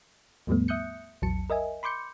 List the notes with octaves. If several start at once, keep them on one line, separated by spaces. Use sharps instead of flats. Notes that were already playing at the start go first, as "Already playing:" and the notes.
D#2 G#2 F3 G3 A3 B3
E5 D#6 F#6 G6 C#7
A#1 E2 F#3 A5 C#7
A#4 D#5 E5 G#5
B5 C6 D6 G6 C#7